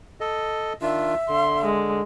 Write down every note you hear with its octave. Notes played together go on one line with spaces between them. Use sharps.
A4 D#5
D#3 D4 F4 E5
D3 C6
G#3